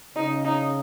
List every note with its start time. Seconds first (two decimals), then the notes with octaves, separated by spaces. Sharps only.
0.15 C#3 D#4
0.45 D#4